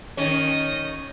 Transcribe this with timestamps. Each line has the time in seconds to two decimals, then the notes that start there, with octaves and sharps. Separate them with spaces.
0.17 D#3 C#4 D#5